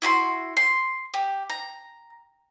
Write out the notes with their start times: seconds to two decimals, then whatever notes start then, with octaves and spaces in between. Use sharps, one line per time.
0.02 E4 F#4 B5 C6
0.57 C6
1.14 G4
1.50 A#5